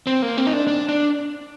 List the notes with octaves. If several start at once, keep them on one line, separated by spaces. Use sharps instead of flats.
C4
A#3
C4
D#4
D4
D4
D4